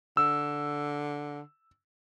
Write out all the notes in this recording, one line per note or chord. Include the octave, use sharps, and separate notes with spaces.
D3 E6